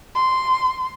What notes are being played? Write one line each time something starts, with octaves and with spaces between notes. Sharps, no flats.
C6